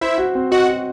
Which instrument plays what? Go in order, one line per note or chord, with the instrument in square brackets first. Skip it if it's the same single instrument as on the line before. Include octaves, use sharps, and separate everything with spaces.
[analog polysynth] E4 E5 [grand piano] C5
[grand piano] F#4
C4
[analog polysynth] F#4 F#5 [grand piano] D#5
[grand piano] F#4